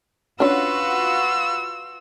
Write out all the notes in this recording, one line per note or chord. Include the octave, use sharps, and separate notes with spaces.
C#4 D4 F4 F#4 B4 E6